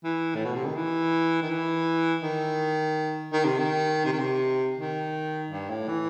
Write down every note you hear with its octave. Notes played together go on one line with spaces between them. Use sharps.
E3
A2
B2
C3
D#3
E3
D#3
E3
D#3
D#3
C3
D#3
C3
D#3
C3
D#3
G2
A2
E3